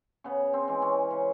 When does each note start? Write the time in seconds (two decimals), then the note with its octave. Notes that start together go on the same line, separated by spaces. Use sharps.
0.24 C#3 B3
0.53 C4
0.68 E3 G#3
0.82 C#4
1.11 C#3